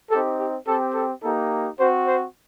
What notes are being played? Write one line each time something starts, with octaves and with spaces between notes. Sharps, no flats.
C4 D#4 G4 A4
G4
C4 G4 A4
A4
A#3 D#4 G4 A4
C4 F#4 C5
C5